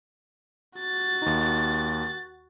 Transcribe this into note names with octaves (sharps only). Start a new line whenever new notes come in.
F#4 A6
D#2 D#4